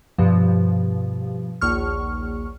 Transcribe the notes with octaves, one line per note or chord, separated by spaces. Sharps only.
G2 B2 F3
A#1 D#2 C#6 F6